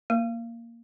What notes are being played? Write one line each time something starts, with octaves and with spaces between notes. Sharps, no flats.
A#3